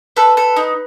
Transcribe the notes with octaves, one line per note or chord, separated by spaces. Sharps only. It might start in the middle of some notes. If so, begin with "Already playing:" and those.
A4 B4
A4
D#4